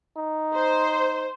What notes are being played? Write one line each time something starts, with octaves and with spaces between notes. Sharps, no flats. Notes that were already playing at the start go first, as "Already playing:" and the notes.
D#4
C5